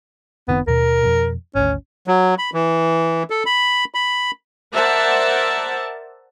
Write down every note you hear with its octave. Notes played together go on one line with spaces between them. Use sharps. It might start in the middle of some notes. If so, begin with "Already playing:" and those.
F#1 D#3 B3 C4
D#2 B2 A#4
F2 B2
G#1 D2 C#4
F#3
B5
E3
A4
B5
B5
A#4 C5 D5 E5 F#5 A5